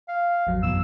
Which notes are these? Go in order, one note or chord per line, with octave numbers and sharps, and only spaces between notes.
F5
A1 F2 F#3
F#2 B2 E3 E6